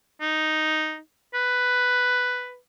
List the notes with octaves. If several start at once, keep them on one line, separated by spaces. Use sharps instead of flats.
D#4
B4